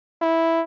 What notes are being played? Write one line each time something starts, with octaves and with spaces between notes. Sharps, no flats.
E4